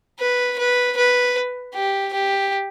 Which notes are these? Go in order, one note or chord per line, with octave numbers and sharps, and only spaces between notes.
B4
B4
B4
G4
G4